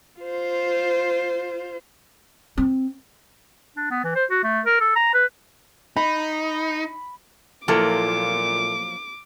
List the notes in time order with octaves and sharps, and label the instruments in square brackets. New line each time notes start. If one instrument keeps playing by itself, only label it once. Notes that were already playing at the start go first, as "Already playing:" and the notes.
[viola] F4 C5
[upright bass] C4
[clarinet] D4
B3
E3
C5
F#4
A3
A#4
A4
A#5
B4
[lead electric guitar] D#4 [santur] B5
[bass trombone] A#2 [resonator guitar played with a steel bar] F3 F#3 A#3 [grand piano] E4 A4 [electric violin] D6